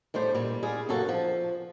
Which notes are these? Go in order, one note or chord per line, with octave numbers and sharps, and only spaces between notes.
A2 G3 A3 C5
A#2 G3
G3 F4 G#4
F#2 C#3 A#3 F#4 A4
F3